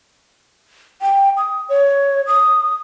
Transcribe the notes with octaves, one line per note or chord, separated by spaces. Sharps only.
G5
D#6
C#5
D#6